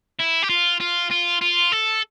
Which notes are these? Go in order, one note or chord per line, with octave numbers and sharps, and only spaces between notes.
E4
G4
F4
F4
F4
F4
A4